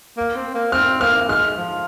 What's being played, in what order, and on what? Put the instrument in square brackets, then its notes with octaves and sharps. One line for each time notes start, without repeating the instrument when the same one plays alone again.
[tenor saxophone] A#3
C4
A#3
[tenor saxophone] C4 [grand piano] F6
[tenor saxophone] A#3 [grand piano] F6
[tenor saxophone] G#3 [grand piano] F6
[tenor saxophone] F3